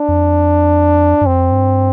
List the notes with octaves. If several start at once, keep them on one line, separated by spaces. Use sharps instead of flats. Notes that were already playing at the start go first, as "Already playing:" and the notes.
Already playing: D4
F2
G2
F2 C4
G2